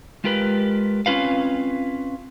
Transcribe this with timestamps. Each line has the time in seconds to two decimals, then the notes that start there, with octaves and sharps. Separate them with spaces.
0.24 G#3 F4 G4 A#4 B4
1.06 C4 C#4 F4 B4 F5